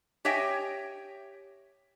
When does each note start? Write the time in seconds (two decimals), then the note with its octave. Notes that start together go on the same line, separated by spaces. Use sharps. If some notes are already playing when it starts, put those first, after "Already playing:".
0.25 G4 C#5 D#5 E5 G5 G#5